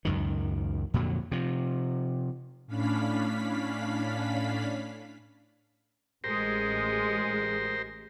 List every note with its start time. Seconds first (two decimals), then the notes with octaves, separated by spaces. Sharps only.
0.05 C#2 F#2 D#3
0.94 F2 A#2 D3 F#3
1.32 C3 F3
2.67 A2 C#4 D4 F5 B5 B6
6.24 A1 G#3 G4 A#4 C5